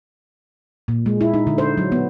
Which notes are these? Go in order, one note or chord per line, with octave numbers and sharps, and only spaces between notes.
A#2
G#3
E4
D#4
D3
C5
F#3
B3